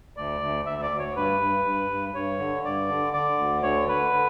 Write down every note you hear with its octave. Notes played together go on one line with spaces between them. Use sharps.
D2 D5
D2
D2 E5
D5
D2
C#5
G2 B4
G2
G2
G2
G2 C#5
D3
G2 D5
D3
D3 D5
D2
D3 C#5
D3 B4
D3